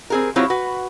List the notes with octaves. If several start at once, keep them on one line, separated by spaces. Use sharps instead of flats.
C4 G#4 A#4
F#3 C4 E4 F4 G4 C#5
F#4 B4